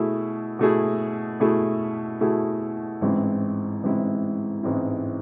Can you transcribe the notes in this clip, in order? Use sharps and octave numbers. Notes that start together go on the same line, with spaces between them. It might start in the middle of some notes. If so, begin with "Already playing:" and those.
Already playing: B2 A3 E4 G#4
B2 A3 E4 G#4
B2 A3 E4 G#4
B2 A3 E4 G#4
A1 G#2 G#3 C4 E4
A1 G#2 G#3 C4 E4
A1 G#2 G#3 C4 E4